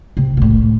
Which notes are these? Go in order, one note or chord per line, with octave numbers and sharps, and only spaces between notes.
C3
B2
A2